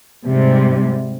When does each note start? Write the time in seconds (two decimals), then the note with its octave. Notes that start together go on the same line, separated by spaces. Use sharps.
0.24 G#2 C3 G3